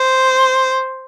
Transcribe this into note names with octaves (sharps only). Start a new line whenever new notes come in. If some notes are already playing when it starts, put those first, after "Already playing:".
Already playing: C5